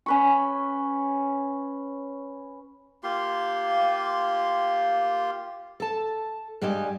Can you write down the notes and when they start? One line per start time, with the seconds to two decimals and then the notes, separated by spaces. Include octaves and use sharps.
0.06 C#4 B4 C#6
3.04 A#3 F4 G4 C6
5.80 A4 A5
6.62 G2 G3 G#3 G4 D#5 G#5